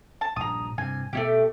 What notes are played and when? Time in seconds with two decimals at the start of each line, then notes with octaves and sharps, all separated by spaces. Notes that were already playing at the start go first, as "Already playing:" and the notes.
0.21 A5
0.36 A#1 G2 A#5 D#6
0.78 G2 C3 G#5
1.13 B2 F#3 A3 B3 E4 G4